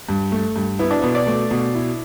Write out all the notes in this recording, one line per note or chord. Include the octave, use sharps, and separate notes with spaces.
G2
A3
G2
B3 E4
D4
B2 B3
D5
A3
B2
E4